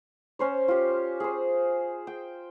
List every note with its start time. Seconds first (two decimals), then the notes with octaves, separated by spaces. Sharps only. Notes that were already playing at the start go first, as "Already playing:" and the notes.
0.39 C#4 C5 C#5
0.68 F4 G4
1.20 G#4 C5
2.07 G5